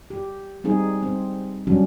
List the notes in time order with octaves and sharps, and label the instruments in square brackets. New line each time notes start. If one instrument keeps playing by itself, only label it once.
[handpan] G4
G3 C4 D#4 G#4
C4
F#3 G3 C#4 D4 F#4